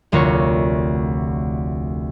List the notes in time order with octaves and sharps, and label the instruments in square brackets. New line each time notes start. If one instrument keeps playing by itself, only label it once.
[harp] F1 D2 F4 A#4 C#5